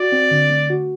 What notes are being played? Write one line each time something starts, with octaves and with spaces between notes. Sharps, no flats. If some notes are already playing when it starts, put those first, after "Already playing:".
Already playing: F#4 D5
C4
D3
A3
F#4